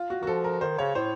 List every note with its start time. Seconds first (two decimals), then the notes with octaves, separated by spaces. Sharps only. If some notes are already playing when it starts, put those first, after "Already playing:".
Already playing: F4
0.10 F#4
0.22 D#3 F#4
0.27 F3 A4
0.44 A#4
0.61 D#3 C5
0.78 C#3 C#5
0.95 A2 C5